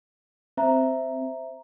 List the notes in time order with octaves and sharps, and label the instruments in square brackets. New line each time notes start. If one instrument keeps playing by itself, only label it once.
[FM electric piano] C4 [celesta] C5 E5 A#5